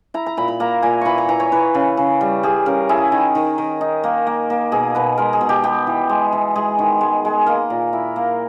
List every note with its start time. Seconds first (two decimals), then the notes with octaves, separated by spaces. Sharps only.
0.14 E4 A#5
0.26 A#5
0.37 A#2 B5
0.48 B5
0.60 A#3 A#5
0.82 A#2 G#5
1.01 E3 B5 C#6
1.18 A#5
1.29 E3 A#5
1.40 C#5
1.52 E3 B4
1.75 C#3
1.97 C#3
2.21 G3
2.43 G3 G#4
2.66 C#3 A#4
2.89 E4 G#4
3.12 D#3
3.35 D#3
3.58 D#3
3.81 D#4
4.04 A#3
4.27 A#3
4.50 A#3
4.72 B2 G#4
4.95 B2 B4
5.18 G#3 A#4
5.33 G#4
5.41 B2
5.49 G4
5.64 B3 G4
5.87 E3
6.09 G#3
6.33 E3
6.56 G#3 G#4
6.79 D#3
7.01 G#3
7.25 G#3
7.47 A#3 A#4
7.70 A#2
7.93 E4
8.16 A#3